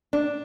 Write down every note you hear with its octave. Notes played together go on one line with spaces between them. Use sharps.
D4